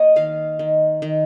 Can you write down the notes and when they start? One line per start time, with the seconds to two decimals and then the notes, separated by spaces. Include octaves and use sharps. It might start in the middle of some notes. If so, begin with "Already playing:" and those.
Already playing: A#3 C#5 D#5
0.16 D#3 F5
0.59 D#3
1.02 D#3